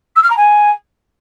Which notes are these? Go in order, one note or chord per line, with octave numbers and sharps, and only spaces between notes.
E6
F6
A#5
G#5